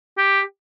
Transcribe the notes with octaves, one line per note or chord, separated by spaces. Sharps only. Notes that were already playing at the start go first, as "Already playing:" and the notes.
G4